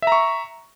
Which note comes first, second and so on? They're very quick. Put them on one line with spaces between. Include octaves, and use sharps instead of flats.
E5 A#5 C#6